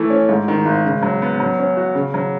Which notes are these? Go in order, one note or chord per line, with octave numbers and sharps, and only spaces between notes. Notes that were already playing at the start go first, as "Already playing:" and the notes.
Already playing: E3 A3
C#4
G#2
D#3
G#1
C#3
F#3
B3
F#3
C#4
F#4
C#3
F#3